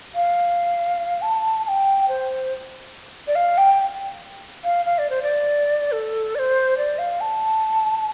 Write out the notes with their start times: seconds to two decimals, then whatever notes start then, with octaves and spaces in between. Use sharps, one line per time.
0.15 F5
1.22 A5
1.65 A5
1.68 G5
2.08 C5
3.27 D5
3.35 F5
3.58 G5
4.64 F5
4.86 F5
4.98 D5
5.10 C5
5.22 D5
5.92 A4
6.35 D5
6.39 C5
6.77 D5
6.99 F5
7.21 A5